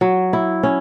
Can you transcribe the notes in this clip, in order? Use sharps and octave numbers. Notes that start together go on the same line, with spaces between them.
F#3
E4
C#4